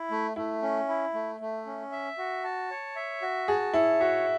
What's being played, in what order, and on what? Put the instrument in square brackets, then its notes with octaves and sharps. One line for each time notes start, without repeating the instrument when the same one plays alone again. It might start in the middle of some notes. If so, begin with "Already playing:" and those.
Already playing: [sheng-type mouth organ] E4
A3
[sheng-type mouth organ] A3 [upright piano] E4
[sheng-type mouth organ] C#4
E4
A3
A3
C#4
E5
F#4
A5
C#5
E5
F#4
[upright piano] G#4 [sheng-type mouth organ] A5
[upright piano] E4 [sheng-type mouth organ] C#5
[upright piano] F#4 [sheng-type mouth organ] E5